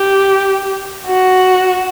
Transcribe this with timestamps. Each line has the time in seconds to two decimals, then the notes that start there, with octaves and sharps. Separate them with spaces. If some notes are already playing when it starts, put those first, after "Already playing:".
Already playing: G4
1.07 F#4